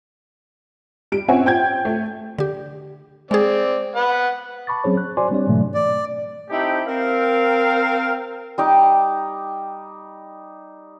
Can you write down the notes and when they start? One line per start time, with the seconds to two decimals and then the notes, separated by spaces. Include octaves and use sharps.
1.12 G3 D7
1.28 C4 C#4 C#5 E5 F#5 G#5
1.45 C5 G5 G6 G#6
1.85 A3
2.39 D3 G4
3.31 G#3 C4 G#4 D5
3.96 B4 F#5
4.67 A5 B5 C#6 D6 A6
4.84 F#3 C4 C#4 G#4 C5 C#5
4.97 F#6
5.17 F#4 C5 D5 G#5 C6 D6
5.31 G3 C4 D4 G4 C#5 D5
5.47 G#2 B2 E3 F#3 A3
5.74 D5
6.50 A3 C4 D#4 E4 G4
6.88 C4 A#4 F5
8.58 G3 D#4 D6